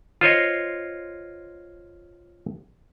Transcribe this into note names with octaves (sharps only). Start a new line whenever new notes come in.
F4 C5 C#5 D#5